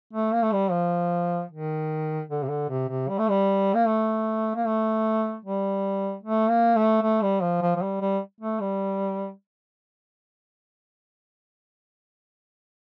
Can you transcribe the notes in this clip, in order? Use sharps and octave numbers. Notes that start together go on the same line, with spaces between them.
A3
A#3
A3
G3
F3
D#3
D3
C3
D3
C3
C3
G3
A3
G3
A#3
A3
A#3
A3
G3
A3
A#3
A3
A3
G3
F3
F3
F3
G3
G3
A3
G3